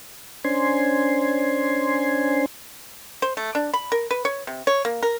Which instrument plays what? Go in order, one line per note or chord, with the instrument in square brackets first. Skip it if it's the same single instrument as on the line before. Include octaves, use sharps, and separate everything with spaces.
[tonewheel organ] C#4 D4 C5 G#5 C6
[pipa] C5
A3
D4
B5
A#4
B4
C#5
C3
C#5
A#3
A#4